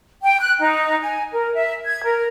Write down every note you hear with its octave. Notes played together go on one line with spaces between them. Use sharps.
G5
F#6
D#4
G#5
A#4
E5
G#6
A#4